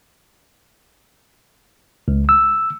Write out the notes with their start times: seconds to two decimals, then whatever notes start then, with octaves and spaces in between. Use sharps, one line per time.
2.08 C#2
2.29 E6